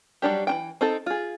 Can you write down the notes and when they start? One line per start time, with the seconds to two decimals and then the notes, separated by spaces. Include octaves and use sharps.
0.22 F#3 G3 D4 G4
0.47 E3 D#4 G5
0.81 C4 D#4 A4
1.06 F4 G#4